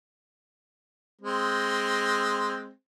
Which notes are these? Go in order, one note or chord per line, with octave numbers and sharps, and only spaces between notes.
G#3 C4